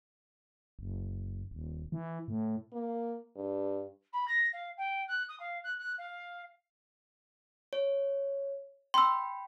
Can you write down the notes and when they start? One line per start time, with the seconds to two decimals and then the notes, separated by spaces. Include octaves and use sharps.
0.79 F#1
1.51 D#1
1.92 E3
2.28 A2
2.73 A#3
3.36 G2
4.13 B5
4.27 A#6
4.53 F5
4.77 G5
5.08 F#6
5.28 D#6
5.39 F5
5.63 F#6
5.78 F#6
5.98 F5
7.73 C#5
8.94 G5 B5 C6 E6